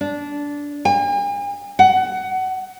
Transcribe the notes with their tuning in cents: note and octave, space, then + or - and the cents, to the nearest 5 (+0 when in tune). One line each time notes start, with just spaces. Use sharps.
D4 -15
G#5 -45
F#5 +20